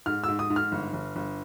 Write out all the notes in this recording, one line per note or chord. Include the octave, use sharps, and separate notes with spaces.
G#2 F6
G#2 E6
D#6
G#2
F6
G1
G1
G1